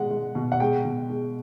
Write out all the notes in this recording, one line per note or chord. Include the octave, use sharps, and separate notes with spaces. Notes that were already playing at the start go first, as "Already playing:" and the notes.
Already playing: B2 G#3 F#5
G#3
B2
F#5
G#3 G5
B2
G#3